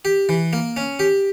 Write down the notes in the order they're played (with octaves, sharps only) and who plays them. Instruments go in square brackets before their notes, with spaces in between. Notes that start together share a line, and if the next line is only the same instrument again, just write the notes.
[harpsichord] G4
E3
A#3
C#4
G4